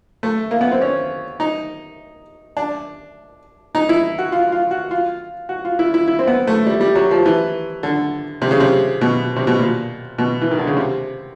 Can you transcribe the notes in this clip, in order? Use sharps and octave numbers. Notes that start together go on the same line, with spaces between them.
A3
A#3
B3
C4
C#4
D#4
D4
D#4
E4
F#4
F4
F4
F#4
F4
F#4
F4
E4
E4
E4
C4
B3
A3
G3
G3
F#3
F3
E3
D3
C3
C#3
C3
B2
C3
B2
A#2
B2
E3
D#3
D3
C#3
C3